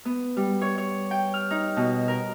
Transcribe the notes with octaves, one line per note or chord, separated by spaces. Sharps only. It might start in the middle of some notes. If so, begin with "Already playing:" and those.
B3
G3
C#5
C#5
G5
F6
D#4
B2
A#4